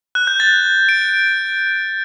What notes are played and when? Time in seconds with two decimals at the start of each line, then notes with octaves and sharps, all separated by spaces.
0.15 F#6
0.27 G6
0.40 A6
0.89 D7